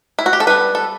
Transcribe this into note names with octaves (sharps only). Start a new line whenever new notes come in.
E4
F#4
G4
A4
G3 B3 D4 B4
A4